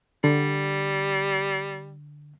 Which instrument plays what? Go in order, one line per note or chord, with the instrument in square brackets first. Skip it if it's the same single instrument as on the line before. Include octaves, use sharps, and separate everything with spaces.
[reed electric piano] D3 [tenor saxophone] G3